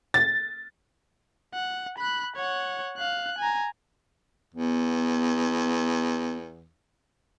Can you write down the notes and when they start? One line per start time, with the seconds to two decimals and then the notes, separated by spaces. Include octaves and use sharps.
0.14 A6
1.54 F#5
1.98 B5 F#6
2.36 C#5 F#5
2.97 F5 F#6
3.38 G#5 A#5
4.55 E2 B3